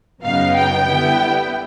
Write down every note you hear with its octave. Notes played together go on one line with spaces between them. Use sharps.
F#2 C#3 F#3 B3 D#4 F5
G5
D3 G3 B3 E4